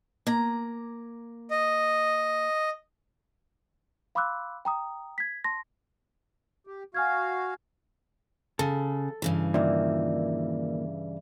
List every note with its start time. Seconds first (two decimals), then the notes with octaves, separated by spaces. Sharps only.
0.27 A#3 A#5
1.51 D#5
4.15 F5 B5 C6 D6 E6 F#6
4.65 G5 A#5 D#6
5.18 G#6 B6
5.44 A5 C6 A#6
6.67 G4
6.94 F#4 F5 G#5 F6 G#6
8.59 C#3 A4
9.22 G2 C#3 E3
9.54 A#2 D#3 D5 E5